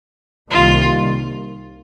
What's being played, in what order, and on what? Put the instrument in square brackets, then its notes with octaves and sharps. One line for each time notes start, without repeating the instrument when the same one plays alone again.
[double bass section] C2 C3 D#3 G3 A#3 [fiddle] F4